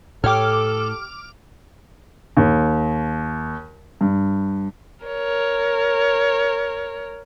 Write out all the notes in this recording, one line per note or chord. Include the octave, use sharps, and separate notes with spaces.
A2 G4 A4 C#5 D6 F6
D#2
G2
A#4 C#5